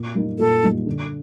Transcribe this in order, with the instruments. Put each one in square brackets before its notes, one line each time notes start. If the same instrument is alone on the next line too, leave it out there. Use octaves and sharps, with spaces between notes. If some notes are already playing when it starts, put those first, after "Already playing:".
Already playing: [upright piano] A#2
G3 A#3 D#4
[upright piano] A#2 [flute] A4
[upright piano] G3 A#3 D#4
D3